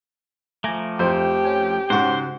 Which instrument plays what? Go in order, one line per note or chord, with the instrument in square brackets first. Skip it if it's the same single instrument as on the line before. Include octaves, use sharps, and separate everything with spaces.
[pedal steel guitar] F3 A3 [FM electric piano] G#5 A#5 D6
[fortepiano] F2 C5 [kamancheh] G4
[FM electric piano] C#4 G#5
[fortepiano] G#2 [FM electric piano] C#3 F#4 F#5 [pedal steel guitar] C5